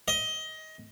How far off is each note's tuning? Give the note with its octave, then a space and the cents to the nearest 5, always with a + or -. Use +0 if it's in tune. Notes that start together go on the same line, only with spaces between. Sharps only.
D#5 +20